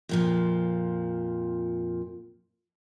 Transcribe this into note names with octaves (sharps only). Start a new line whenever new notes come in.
F2 A#2 F3